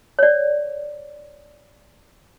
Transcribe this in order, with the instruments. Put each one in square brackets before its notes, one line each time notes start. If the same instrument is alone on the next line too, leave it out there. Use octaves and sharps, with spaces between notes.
[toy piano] C#5 D5